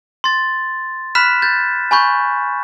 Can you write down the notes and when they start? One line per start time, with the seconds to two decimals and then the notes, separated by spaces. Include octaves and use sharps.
0.24 C6 A6
1.15 B5 F6 F#6 B6 E7
1.42 G6 A6
1.91 G#5 B5 C#6 G6